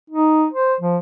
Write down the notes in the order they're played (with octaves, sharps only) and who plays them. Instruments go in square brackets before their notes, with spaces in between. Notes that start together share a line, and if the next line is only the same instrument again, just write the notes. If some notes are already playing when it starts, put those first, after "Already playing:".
[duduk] D#4
C5
F3